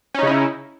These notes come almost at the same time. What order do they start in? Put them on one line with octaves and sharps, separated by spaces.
C#4 D#4 C#3 E4